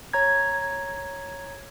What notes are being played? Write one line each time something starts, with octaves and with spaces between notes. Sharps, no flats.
C#5 A#5 G#6